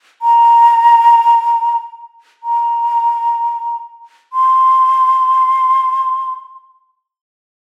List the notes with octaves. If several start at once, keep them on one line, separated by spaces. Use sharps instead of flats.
A#5
A#5
C6